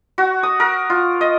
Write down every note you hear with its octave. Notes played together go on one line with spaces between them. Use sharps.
F#4
D#6
A#4
F4
D#5